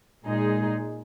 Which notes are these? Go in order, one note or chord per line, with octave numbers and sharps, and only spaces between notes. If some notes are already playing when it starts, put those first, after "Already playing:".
A#2 G#3 D#4 G#4